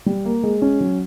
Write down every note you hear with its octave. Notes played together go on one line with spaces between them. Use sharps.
G3
A#3
G#3
C#4
F#3